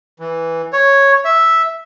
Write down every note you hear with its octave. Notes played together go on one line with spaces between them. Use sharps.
E3
C#5
E5